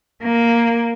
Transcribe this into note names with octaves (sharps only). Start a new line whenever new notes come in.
A#3